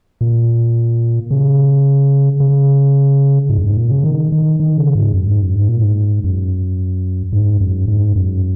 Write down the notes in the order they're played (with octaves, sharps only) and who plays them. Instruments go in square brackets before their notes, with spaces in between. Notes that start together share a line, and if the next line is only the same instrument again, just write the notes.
[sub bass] A#2
C#3
C#3
G#2
F#2
G#2
A#2
C#3
D#3
D#3
D#3
C#3
G#2
F#2
G#2
F#2
G#2
A#2
G#2
F#2
G#2
F#2
G#2
F#2